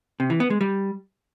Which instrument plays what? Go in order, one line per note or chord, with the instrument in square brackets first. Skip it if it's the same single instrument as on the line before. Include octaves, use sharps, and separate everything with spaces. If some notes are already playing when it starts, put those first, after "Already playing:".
[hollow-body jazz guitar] C3
E3
B3
G#3
G3